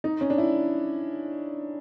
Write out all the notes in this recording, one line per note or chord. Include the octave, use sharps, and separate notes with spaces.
D#4
C#4
D4
E4